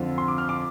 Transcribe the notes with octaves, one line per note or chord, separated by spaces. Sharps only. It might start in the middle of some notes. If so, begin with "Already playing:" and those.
Already playing: F2 D3 F3
C6
D6
F6
D6